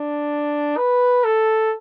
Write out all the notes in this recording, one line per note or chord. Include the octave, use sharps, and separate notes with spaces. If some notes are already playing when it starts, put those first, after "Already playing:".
Already playing: D4
B4
A4